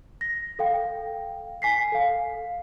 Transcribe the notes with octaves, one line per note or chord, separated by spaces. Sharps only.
A#6
A4 F5 G5
G#5 B6 C7
A4 F5